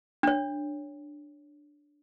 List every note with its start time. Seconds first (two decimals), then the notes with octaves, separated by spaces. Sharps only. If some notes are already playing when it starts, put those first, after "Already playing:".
0.23 D4 C#5